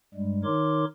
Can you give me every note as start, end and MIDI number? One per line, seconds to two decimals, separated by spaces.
0.14 0.44 43
0.14 0.44 55
0.14 0.44 56
0.44 0.85 51
0.44 0.85 63
0.44 0.85 70
0.44 0.85 73
0.44 0.85 84
0.44 0.85 86